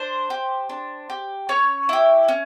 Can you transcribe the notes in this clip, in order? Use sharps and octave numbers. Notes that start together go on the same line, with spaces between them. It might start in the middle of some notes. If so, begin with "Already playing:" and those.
Already playing: D4 C5
G4
D4
G4
C#4 C#5
E4 G4
C#4